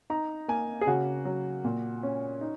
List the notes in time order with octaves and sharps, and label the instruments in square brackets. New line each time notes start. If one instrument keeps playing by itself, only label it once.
[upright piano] D#4 A#5
A#3 G#5
G#4
C#3 F#4
F#3
A#2
C#4
D#4